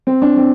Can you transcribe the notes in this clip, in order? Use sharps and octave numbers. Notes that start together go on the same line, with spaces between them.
C4
D4
C4